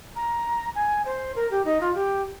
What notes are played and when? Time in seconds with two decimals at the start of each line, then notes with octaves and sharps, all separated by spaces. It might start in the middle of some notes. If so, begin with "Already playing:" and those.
0.16 A#5
0.75 G#5
1.05 C5
1.36 A#4
1.51 G4
1.65 D#4
1.81 F4
1.95 G4